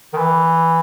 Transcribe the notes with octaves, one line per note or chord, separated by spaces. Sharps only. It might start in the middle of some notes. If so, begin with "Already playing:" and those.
D#3
E3